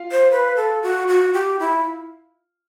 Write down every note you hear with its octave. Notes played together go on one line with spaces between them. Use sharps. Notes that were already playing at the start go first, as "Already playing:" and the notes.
Already playing: F4 F5
C5
B4
A4
F#4
F#4
G4
E4